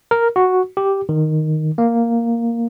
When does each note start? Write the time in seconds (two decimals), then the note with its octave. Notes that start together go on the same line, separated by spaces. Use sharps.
0.11 A#4
0.36 F#4
0.77 G4
1.09 D#3
1.78 A#3